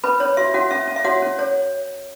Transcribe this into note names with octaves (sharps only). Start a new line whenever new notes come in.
C#4 B4 B5
C#4 C#5
F#4 E5
C#4 F#4 F#5
C#4 E5
C#4
E5
F#4 C#5 F#5
C#4
C#5